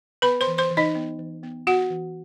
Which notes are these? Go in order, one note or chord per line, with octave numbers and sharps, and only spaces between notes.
B3 B4 B5
C5 C6
E3
C5 C6
E3
D#4 D#5
B3
E3
B3
B3 F#4 F#5
E3